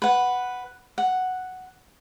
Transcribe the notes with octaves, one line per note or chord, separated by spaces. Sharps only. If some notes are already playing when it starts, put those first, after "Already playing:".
B4 F#5
F#5